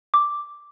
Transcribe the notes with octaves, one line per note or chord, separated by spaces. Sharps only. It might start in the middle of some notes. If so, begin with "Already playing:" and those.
D6